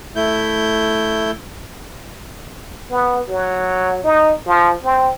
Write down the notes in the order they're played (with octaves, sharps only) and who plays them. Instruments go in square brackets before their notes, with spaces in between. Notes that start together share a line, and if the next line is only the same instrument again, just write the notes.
[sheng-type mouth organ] A3 E4 G6
[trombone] B3
F#3
D#4
F3
C4